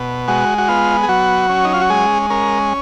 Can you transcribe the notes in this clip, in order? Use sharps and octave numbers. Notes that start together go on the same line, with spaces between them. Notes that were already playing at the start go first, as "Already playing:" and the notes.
Already playing: B2
G#3 F#4
F#4
B3 F4
G#4
F#3 F#4
C#4
D#4
F4
F#4
G#3 G#4
C#4 A#4